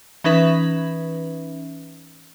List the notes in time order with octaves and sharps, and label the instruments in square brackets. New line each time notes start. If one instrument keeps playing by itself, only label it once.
[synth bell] E3 C#4 D#4 B4 E5